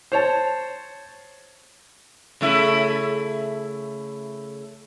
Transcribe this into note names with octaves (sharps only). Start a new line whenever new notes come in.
C5 C#5 A5
C#3 A3 E4